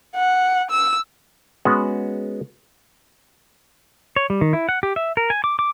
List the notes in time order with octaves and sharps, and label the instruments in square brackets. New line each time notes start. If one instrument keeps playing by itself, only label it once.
[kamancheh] F#5
E6
[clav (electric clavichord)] G#3 B3 C#4 F#4
[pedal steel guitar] C#5
G3
D#3
E4
F#5
G4
E5
A#4
G#5
D6
D6